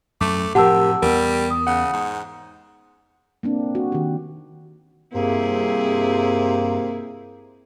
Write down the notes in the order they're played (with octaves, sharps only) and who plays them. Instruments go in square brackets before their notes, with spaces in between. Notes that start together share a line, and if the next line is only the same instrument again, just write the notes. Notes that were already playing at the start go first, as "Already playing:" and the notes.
[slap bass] F#2 [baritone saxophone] A3 [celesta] D6
[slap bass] A2 F3 [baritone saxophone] C3 [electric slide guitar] G4 A#4 [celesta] F#5 A5 E6
[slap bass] E2 B3 [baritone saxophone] G3 [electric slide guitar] A#4
[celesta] D#6
[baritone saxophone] C#3 [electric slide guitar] F#5
[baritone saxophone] G#2
[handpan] A#3 C4 D4
F#4
D#3 G4
[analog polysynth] G2 [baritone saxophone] C3 [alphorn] A#3 [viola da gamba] C4 E4 G#4